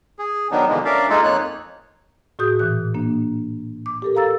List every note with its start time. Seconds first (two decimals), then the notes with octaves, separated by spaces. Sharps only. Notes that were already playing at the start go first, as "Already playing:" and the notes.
0.19 G#4
0.51 D#3 F#3 B3 D4 D#4
0.69 B2 D3 E3 F3 G#3 A#3
0.85 C#4 D4 A#4 D5 E5 F5
1.10 G#3 A#3 D#4 F4 A4
1.24 F2 A#3 D#4 C#5 F#6
2.39 A2 F#4 G#4 D#6 G6
2.59 A#2 E3 F#6
2.94 A#3 D4
3.86 D6
4.02 G4 A4 A#4
4.15 A4 F5 A#5 E6 A6